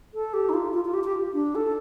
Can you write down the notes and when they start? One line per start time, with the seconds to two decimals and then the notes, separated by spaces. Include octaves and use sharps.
0.14 A4
0.34 G4
0.49 D#4
0.54 F4
0.74 F4
0.85 F4
0.94 G4
1.04 G4
1.34 D4
1.55 A4